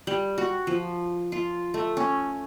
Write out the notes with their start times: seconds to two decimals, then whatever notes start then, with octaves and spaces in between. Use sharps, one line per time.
0.07 G3
0.38 F#4
0.67 F3
1.32 F4
1.74 A3
1.97 C#4